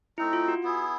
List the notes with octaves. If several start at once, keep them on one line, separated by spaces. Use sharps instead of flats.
A3 C4 D#4 E4
F4
F#4
B3 E4 G#4